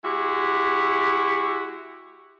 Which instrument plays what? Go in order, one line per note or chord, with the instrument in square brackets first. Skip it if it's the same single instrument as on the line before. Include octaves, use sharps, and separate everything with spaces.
[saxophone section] G#3 E4 F#4 G4